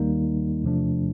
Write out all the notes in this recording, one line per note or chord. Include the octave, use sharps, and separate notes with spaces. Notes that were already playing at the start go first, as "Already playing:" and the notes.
Already playing: D#2 D#3 G3 A#3 D#4
E2 C3 F3 A3 D4